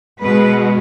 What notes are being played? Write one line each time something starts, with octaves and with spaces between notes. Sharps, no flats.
B2 G#3 B4